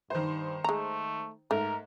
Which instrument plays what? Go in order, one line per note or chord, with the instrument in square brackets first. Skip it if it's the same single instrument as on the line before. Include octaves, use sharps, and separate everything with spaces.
[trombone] G2 [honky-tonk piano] D#3 C5
[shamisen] G#3 A#5 [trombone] A3
[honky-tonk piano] G#2 [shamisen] A3 [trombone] A#4